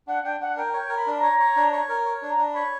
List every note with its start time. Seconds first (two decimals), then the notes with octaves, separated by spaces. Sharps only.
0.07 D4 F#5
0.24 D4 G5
0.40 D4 F#5
0.56 A#4 G5
0.74 C#5 G5
0.89 A#4
0.95 B5
1.07 D4
1.17 A#5
1.23 C#5
1.39 C#5
1.56 D4
1.72 C#5
1.89 A#4
2.06 C#5
2.22 D4 A#5
2.38 D4
2.49 B5
2.55 C#5